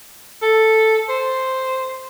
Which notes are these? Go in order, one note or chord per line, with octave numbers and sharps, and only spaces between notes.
A4
C5